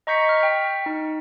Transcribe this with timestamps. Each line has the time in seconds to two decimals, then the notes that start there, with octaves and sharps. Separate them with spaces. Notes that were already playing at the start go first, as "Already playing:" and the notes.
0.07 D#5 A#5 C#6 G6 B6 C#7
0.29 F6
0.43 G5 B6
0.86 D#4